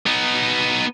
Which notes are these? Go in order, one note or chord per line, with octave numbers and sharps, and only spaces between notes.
B3 D#4